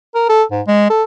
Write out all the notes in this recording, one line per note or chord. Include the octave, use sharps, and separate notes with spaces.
A#4
A4
G#2
G#3
A4